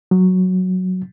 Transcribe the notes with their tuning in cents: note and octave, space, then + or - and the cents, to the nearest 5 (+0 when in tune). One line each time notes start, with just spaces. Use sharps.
F#3 -5